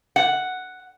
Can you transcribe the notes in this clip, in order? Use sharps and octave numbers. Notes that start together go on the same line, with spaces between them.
F#5